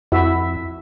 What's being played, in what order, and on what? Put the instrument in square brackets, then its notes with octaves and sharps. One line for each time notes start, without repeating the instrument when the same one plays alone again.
[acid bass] F2 [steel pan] E4 F#4 E5